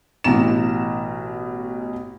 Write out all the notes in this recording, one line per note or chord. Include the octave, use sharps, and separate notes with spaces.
A1 B2 A#5 E7